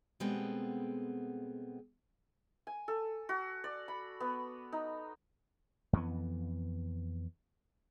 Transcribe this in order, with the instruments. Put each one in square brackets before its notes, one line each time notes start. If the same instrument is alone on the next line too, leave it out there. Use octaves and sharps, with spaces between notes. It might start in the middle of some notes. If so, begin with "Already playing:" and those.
[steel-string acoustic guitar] B2 G3 G#3 B3 C4 A4
[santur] G#5
A4
F#4
D5
B5
B3
D#4
[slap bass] F2 E3 B3